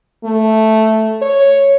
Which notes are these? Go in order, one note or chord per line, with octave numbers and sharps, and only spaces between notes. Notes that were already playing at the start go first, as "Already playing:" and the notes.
A3
C#5